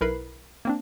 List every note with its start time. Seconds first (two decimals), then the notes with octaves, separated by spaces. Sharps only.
0.01 B1 E4 A#4 B4 B5 C7
0.65 A#3 C4 D4